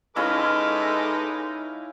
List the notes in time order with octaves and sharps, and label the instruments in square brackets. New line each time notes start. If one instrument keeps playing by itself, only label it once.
[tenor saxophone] G#3 [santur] C#4 E4 F5 [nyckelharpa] D#4 [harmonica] A4 B4 D6